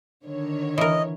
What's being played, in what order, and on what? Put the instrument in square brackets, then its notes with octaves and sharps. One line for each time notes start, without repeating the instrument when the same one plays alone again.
[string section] D3 D#3 C#5
[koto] E3 A#4 [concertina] D#5